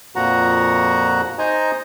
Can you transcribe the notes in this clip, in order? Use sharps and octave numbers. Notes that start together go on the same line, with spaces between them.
F2 A#2 F3 F#4 F#5 A#5
D#4 C5 D#5 G#5 A#5